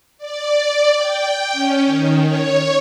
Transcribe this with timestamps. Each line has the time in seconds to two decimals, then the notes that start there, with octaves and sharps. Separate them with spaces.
0.18 D5
0.96 G5
1.52 C#4
1.86 D#3
2.22 C#5